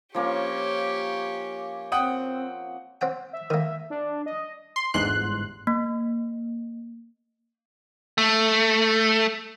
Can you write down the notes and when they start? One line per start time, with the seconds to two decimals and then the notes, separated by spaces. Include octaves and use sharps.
0.14 F3 A#3 C#4 G4 C#5
1.92 C4 F#5 G5 D#6
3.01 C4 F#5 G5
3.33 E5
3.50 D#3 A#3
3.90 D4
4.26 D#5
4.76 C6
4.94 G1 E2 G#2 C6 F#6
5.67 A#3
8.18 A3